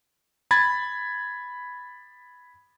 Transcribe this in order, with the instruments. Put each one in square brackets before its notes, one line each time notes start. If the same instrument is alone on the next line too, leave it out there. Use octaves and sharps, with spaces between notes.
[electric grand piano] B5 G#6 A6